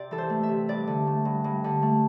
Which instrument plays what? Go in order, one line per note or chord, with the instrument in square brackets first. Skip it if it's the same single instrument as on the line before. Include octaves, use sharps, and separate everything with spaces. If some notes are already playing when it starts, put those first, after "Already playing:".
Already playing: [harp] C3 D5
E3 A4
C5
A3
E5
C3
G2 D5
D3
A3
G2
G2
D3
A3